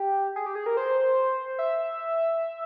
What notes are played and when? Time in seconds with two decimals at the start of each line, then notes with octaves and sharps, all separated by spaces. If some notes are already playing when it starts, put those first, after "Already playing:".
Already playing: G4
0.36 G#4
0.46 G4
0.55 G#4
0.66 A#4
0.77 C5
1.59 E5